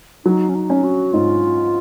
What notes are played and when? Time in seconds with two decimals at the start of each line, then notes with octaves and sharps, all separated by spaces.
0.25 F#3 D#4
0.49 C#4
0.55 D#4
0.70 C#4
0.84 F#4
1.13 G#2 F4